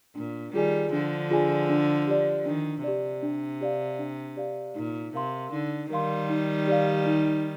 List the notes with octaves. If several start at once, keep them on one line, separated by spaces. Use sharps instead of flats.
A#2 D4
D#3 G3 F4 G#4 D5 G#5
D3 F3 D4
F4 G#4 D5 G#5
D4
G4 D5
D#3 D4
C3 G4 D5
D4
G4 D5 F5
D4
G4 D5 F5
A#2 D#4
C3 A#4 F5 C6
D3 D#4
D#3 G3 A#4 F5 C6
D#4
G4 D5 F5
D#4